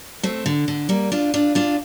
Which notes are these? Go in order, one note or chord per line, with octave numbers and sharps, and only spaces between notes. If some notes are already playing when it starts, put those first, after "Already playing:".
A3 C4
D3
D3
G3 A#3
D4 F4
D4 F4
D4 F4